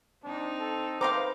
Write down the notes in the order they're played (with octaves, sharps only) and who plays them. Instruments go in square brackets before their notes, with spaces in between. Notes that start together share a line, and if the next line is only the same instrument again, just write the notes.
[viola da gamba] C4 D#4 [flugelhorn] D4
[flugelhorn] A4
[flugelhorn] B4 [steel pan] C5 A#5 [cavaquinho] F5 G5 D6